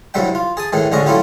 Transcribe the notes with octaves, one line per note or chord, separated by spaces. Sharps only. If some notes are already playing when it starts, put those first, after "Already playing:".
C2 G2 F#3 G3 E5 G5
F4
G#4 A5 D#6
A2 D#3 E3 G#3
A1 D3 G#3 C#4 D#5 C#6
F#3 A3 C#4 E4 F4 G4